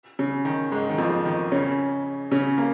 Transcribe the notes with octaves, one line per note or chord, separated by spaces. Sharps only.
C#3
D#3
G#2 G#3
D#3
F2 F3
D#3
C#3 C#4
C#3 C#4
A#3